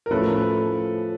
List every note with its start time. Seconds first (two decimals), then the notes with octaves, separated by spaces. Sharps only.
0.06 A#4
0.11 A2 F3 A3 C#4 E4 A4 B4